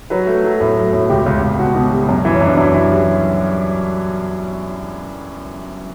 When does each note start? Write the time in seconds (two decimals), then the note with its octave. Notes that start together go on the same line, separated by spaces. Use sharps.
0.10 F#3 B4
0.27 A3
0.44 F#3
0.60 A2
0.77 F#3
0.93 A2
1.10 C#2 G4
1.26 C#2
1.42 C#2
1.59 B2 F#4
1.75 B2
1.91 G3
2.09 F#2
2.25 E3
2.34 C#4
2.41 F#2
2.46 D4
2.57 F#2 E4
2.74 E3
2.90 G3